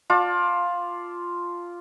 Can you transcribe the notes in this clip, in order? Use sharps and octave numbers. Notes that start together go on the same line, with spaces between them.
F4 D5 A5